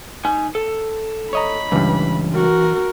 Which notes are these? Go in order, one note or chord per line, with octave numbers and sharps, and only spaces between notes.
D#4 G#5
A4
C#5 D#5 A#5 B5
C#2 G2 E3
F#4 A#4